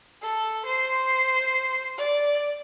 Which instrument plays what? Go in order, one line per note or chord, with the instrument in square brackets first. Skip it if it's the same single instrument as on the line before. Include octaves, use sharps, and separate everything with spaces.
[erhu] A4
C5
D5